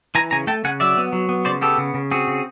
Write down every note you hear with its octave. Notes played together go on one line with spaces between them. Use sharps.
E3 G#5 A#5
C#3 G#5 A#5
A3 G5 A5
C#3 F#5 G#5
F#3 D5 E5
B3
F#3
B3
C#3 C5 D5
B3 G4 A4
C#3
C#3
C4 F#4 G#4
C#3